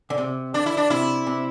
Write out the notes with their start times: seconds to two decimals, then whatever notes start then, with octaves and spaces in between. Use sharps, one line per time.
0.10 D3
0.18 C3
0.54 D3 D4
0.66 E4
0.77 D4
0.90 C3 E4
1.27 C3